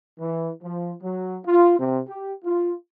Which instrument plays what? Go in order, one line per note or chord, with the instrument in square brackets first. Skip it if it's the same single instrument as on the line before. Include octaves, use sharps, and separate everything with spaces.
[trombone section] E3
F3
F#3
F4
C3
G4
F4